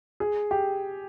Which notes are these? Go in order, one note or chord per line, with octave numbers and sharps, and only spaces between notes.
G#4
G4